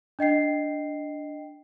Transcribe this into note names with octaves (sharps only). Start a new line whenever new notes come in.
D4 D#5 G5 C7